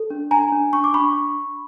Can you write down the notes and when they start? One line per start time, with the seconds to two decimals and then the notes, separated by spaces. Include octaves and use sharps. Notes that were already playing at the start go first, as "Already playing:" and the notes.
Already playing: A4
0.10 D4
0.31 D4 G#5 A#5
0.52 D4
0.73 D4 C#6
0.84 D6
0.94 D4 B5 C#6